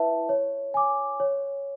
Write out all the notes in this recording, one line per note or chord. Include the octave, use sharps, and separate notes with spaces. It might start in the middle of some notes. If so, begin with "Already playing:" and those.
Already playing: E4 B4 E5 A5
C#5
G#5 D6
C#5